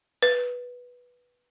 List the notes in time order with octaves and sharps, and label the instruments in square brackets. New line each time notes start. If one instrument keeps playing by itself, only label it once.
[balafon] B4